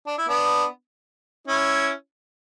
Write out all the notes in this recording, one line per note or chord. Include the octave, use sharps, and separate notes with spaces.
D4
E4
B3 D4
C#4 E4